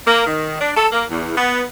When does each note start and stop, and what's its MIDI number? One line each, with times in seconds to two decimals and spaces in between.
0.07 0.26 58
0.27 0.60 51
0.61 0.71 62
0.76 0.87 69
0.92 1.05 58
1.10 1.35 40
1.36 1.64 59